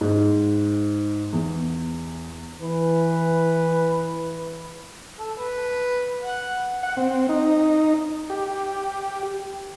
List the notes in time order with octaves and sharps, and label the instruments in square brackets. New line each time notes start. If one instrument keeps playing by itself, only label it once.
[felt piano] G#2
E2
[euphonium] E3 [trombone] B4
[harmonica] A4
B4
F#5
[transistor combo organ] F#5
C4
D#4
G4